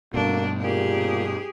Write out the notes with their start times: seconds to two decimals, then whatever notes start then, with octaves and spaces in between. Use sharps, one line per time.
0.14 G2 B2 A#3 D4 F#4 A4
0.60 A#2 G3 A#3 G4 G#4